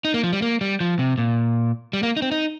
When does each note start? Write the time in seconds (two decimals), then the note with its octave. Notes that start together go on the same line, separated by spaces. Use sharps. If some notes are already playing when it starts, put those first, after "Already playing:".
0.05 D#4
0.14 A#3
0.24 F3
0.33 G3
0.42 A#3
0.61 G3
0.80 F3
0.99 C3
1.18 A#2
1.93 G3
2.03 A#3
2.17 D#4
2.22 C4
2.32 D#4